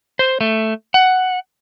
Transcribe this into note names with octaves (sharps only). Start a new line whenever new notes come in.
C5
A3
F#5